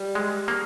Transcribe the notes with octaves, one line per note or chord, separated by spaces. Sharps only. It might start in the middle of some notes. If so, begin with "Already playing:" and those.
Already playing: G3
G#3
A#3